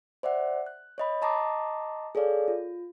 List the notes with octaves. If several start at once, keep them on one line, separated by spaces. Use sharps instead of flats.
C5 D5 E5 F#5
F#6
C#5 D#5 B5
D#5 A5 A#5 C6 D6 D#6
G#4 A4 C#5 D5 F5
F4